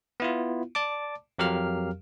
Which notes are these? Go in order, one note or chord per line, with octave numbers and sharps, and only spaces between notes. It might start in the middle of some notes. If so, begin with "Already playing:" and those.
B3 E4 F4
D5 A5 D6
F2 F#3 G4 A#4 F5 F6